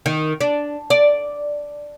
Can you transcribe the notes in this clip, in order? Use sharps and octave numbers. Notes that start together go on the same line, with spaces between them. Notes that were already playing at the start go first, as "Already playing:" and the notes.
D#3
D4
D5